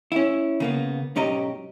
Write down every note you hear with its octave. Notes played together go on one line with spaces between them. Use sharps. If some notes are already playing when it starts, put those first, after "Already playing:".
C#4 E4
C#3 A#3 B3
B1 G#2 C#4 G4 D#5 A#5